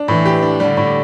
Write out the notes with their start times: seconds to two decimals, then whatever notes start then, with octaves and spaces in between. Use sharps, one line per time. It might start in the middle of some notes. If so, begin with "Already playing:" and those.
Already playing: D4
0.08 A2 E3
0.26 G4
0.43 D4
0.60 D3 G3
0.77 A2